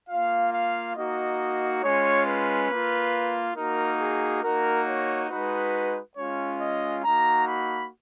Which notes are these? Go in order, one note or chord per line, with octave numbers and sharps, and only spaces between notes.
A#3 F4 F5
F5
A#3 D#4 F#4 D#5
G#3 C#4 F4 C#5
B4
A#3 F4
A#3 D#4 F#4 A#4
G#4
A#3 D#4 F#4 A#4
C#5
G#3 D#4 F#4 B4
G#3 C#4 F4 C#5
D#5
A#3 D#4 F#4 A#5
B5